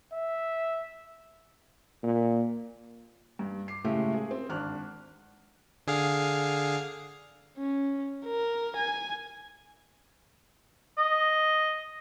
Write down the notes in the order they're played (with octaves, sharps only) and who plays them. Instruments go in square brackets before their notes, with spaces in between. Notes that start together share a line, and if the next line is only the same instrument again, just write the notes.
[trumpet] E5
[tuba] A#2
[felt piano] G2
D6 C7
A2 C#3 G#3 A3 E4 G4
G#4
C4
G#1 D4 F6 F#6
[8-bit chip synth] D3 G#4 F5
[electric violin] C#4
A#4
G#5
[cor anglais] D#5